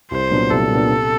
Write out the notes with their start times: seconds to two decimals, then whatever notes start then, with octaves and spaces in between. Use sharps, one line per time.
0.11 C2 C5
0.31 A#2 F#3 B3 D4
0.50 C2 A4
0.70 A#2 F#3 B3 D4
0.89 C3